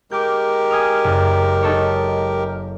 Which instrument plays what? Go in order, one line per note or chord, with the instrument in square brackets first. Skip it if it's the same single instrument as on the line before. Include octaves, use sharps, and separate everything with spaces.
[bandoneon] G#3 G4 A#4 [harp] D6 G6
[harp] G#5 D#6 F6
F#1
D#4 A4 C#5